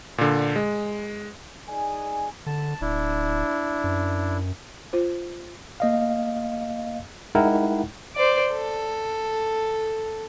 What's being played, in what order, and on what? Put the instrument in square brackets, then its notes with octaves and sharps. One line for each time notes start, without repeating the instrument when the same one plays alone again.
[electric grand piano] A#2 D3
G#3
[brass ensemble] D#4 G#4 D5 G#5
[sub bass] D3 [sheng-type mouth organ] A5
[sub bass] D1 [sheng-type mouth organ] D4 E4
[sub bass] F#2
[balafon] F4 C5
[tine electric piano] A#3 D#5 F5
G#3 D#4 E4 A#4 F#5 G5
[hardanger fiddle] C5 D5
A4